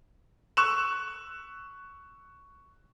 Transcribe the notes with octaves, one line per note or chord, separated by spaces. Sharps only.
C#6 E6 F#6 E7